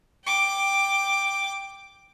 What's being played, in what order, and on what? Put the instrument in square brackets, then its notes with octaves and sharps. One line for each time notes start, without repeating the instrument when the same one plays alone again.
[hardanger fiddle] G5 D6